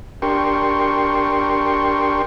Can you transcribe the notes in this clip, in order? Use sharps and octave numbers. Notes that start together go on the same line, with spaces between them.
D4 G4 A#4 G5 C6 C#6